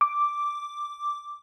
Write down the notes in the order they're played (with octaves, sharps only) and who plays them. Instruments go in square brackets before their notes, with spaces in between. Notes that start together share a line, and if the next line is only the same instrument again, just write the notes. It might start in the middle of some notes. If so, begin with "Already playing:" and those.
[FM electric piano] D6